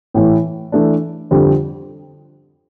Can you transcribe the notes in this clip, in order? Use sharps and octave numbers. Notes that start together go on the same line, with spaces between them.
A2 E3 A3
E3 A3 D4
F2 D3 G3